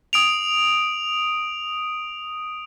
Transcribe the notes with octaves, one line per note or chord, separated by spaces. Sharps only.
D#6 D7 F7